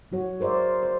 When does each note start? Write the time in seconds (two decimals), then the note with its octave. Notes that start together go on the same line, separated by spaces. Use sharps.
0.12 F#3 F#4 C#5
0.40 G#4 A#4 C5 D5 E5
0.83 C5